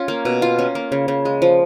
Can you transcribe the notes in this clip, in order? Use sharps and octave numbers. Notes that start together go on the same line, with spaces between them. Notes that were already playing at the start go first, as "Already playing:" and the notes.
Already playing: C#4 F4
A#3
B2
F4
C#4
A#3
C#3
C#3
G#3
F3